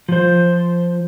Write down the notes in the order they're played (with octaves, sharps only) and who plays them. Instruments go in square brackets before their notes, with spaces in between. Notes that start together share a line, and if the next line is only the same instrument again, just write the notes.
[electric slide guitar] F3 C5